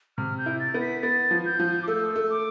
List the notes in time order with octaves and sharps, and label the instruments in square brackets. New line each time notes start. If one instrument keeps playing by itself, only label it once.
[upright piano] C3 [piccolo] F6
[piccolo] G6
[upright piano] E4
[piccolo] A6
[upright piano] B3
[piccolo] B6
[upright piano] B3 [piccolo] A6
[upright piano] F3
[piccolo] G6
[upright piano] F3
[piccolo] D6
[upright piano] A3 [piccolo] E6
[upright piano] A3
[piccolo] D6